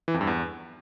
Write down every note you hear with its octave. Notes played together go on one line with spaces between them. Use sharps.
E3
F2
G2
E2